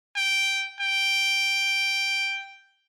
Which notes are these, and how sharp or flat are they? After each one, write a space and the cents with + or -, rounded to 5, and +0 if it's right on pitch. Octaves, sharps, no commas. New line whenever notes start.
G5 -5
G5 +0